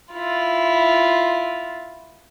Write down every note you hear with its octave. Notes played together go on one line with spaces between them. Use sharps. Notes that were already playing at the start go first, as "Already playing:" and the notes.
E4 F4